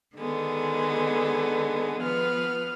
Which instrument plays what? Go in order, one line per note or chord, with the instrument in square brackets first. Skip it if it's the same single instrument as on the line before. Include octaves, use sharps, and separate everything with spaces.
[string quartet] D3 D#3 G#3 B3
F3 B3 B4 F6